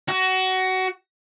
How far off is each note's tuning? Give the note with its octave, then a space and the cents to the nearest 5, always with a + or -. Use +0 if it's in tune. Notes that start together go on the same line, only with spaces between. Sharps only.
F#4 +20